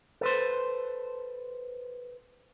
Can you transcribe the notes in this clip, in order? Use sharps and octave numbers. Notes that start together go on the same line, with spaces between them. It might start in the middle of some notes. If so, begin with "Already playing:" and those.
A4 B4 C5